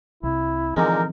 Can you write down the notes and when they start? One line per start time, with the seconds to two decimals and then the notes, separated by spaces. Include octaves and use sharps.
0.23 C2 C3 E4
0.77 A#2 D3 E3 F3 G#3 C4 D#4 A#4